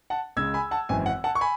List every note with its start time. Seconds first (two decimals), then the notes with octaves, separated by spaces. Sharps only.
0.10 F#5 A5
0.36 C#2 C#3 G#3 E6 G#6
0.54 G#5 B5
0.71 F#5 A5
0.89 G#1 F#2 E3 G#5
1.06 F#5
1.24 F#5 A5
1.35 C#6
1.41 G#5 B5